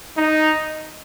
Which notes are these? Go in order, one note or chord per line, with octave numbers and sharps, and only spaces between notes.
D#4